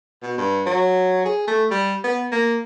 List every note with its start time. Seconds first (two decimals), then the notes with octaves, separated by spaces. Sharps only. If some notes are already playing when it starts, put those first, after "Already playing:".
0.23 B2
0.38 G2
0.66 F#3
1.25 G#4
1.47 A3
1.71 G3
2.04 B3
2.32 A#3